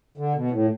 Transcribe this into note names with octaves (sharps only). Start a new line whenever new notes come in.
D3
B2
A2